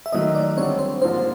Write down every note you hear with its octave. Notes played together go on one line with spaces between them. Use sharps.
E5
D#3 F#3 A3 D#5
D5
D3 G3 C4 C#5
C5
G#2 F3 A#3 D4 F#4 C5